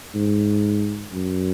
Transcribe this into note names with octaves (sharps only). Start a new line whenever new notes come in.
G#2
F#2